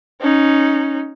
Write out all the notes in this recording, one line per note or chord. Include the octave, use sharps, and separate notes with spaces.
C#4 D#4